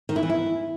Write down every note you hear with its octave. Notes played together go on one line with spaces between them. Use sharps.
D#3
E4
E3
E4